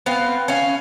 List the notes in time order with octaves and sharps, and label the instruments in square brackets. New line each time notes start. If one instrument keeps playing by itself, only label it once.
[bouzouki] B3 C4 F5
C#4 F5